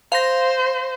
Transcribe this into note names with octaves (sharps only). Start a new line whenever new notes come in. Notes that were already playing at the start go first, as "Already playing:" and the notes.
C5 F5 A#6